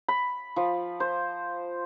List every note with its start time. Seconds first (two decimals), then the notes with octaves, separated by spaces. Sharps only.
0.08 B5
0.56 F3
1.00 C5